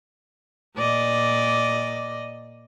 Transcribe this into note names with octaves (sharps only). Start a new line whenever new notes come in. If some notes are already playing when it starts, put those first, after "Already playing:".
A#2 D5 D#5